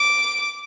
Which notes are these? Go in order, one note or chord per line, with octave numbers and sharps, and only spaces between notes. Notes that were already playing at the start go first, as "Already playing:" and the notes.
Already playing: D6